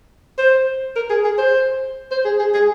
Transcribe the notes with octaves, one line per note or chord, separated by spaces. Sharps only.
C5
A#4
G#4
G#4
C5
C5
G#4
G#4
G#4